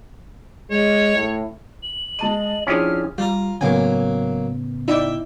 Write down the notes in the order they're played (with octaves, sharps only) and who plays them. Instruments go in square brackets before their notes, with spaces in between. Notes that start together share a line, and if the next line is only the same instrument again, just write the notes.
[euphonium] G#3 [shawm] C#5
[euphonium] A2
[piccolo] F#7
[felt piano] G#3 A5 D#7 [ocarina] D#5
[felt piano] F3 D4 [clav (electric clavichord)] C#4 G4 G#4 [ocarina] E4 [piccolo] F6
[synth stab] G3 [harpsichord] F4 A#5
[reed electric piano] A2 C#3 B3 [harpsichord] F#3 A#3 [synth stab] G#5
[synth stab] D#4 E4 D5 [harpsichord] E5 G5